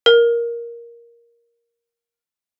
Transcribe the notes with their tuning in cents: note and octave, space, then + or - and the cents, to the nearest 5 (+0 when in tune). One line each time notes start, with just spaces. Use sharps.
A#4 +10